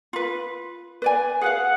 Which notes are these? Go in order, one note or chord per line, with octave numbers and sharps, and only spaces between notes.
F4 B4
B4 D5 G#5
G#4 B4 F5 F#5